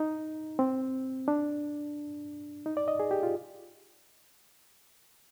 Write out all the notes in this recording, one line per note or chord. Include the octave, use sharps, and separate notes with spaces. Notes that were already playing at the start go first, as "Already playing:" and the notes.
Already playing: D#4
C4
D4
D#4
D5
D#5
G#4
G4
F4